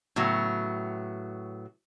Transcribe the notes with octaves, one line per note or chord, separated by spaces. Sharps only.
A2 C#3 F#3 B3